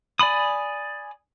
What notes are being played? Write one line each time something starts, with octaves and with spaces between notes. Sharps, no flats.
D5 G#5 B5 D#6